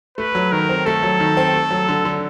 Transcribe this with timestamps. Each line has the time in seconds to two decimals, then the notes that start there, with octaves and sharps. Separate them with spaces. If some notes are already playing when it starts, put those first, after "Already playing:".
0.18 A3 B4
0.35 F#3
0.52 D#3 A#4
0.69 C4
0.86 A3 A4
1.03 F#3
1.20 D#3
1.37 C4
1.54 A3
1.71 F#3
1.88 D3
2.05 D3